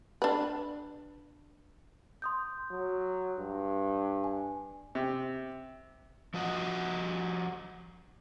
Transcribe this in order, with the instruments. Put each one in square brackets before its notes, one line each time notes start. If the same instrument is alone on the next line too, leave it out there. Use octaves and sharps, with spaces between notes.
[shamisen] D4 B4
[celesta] C6 D#6 G6
[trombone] F#3
G2
[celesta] G#5
[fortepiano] C3
[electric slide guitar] F3 F#4 D#5 F#5